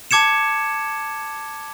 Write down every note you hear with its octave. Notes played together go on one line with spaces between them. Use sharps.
A5 D6 G#6 C#7 E7